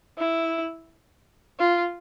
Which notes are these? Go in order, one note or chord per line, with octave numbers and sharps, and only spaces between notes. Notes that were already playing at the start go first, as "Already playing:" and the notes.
E4
F4